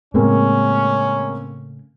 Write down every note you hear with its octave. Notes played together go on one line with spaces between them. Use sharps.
A2 C#3 G#3 A#3 C4 C#4